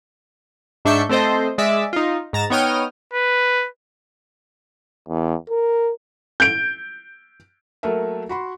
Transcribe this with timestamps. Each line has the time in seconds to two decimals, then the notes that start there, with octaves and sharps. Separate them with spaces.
0.85 G#2 D4 E5 C#6 G6
1.09 A3 C4 A4 C5 D#5
1.58 G#3 D5 E5
1.93 D#4 F4
2.33 G#2 A#5 A6 E7
2.50 B3 D#4 C#5 G5 D#6 F6
3.14 B4
5.08 E2
5.50 A#4
6.40 G6 D7
7.83 F#3 A3 A#3 A4 A#4 E5
8.29 F#4 B5 C6